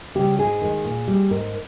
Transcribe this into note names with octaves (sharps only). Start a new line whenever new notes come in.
C#3 G3 G4
G#2 G#4
D#3 G#3
A#2
G3
G#2 A#4